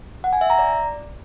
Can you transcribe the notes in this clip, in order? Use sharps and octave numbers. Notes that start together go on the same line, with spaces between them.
F#5
G#5
E5
A#5
D5